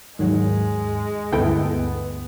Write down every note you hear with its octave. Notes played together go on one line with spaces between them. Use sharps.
D#2 G#2 D#3 F#3 G#3
D2 G2 B3 E4 A4 G5